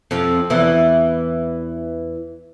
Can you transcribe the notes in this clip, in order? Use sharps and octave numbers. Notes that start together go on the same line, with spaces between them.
F2 F3
E2 E3